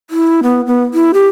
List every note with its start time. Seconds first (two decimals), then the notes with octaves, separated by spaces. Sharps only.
0.10 E4
0.43 B3
0.67 B3
0.94 E4
1.14 G4